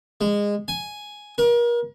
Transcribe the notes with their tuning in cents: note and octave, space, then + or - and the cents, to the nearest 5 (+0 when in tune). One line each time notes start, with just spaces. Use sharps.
G#3 -20
G#5 +5
A#4 +35